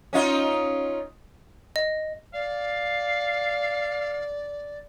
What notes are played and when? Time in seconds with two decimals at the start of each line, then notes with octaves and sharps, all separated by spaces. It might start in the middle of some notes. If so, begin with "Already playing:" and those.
0.13 C#4 D#4 F4
1.76 D#5
2.34 D5 F5